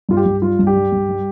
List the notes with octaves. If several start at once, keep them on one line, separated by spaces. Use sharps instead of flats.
G2 F4
G4
G2
G3 F4
G2
G4
G3
G2
G3